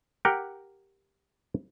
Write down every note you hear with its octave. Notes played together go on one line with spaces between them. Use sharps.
G4 A#4 F#5 G5